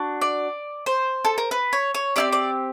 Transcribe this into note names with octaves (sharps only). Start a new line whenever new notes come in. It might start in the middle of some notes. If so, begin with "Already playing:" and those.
Already playing: D4 F#4
D5
C5
A4
A#4
B4
C#5
C#5
C4 E4 G4 D5
D5